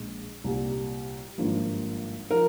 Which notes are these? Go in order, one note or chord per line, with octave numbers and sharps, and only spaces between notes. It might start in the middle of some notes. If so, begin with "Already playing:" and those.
Already playing: A#1 A#2 G#3
C2 A#2 G3
G#1 G2 F3 A#3
F3 A#4